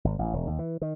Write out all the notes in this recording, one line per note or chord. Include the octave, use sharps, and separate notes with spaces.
G#1
A1
E1
D#2
E3
D#3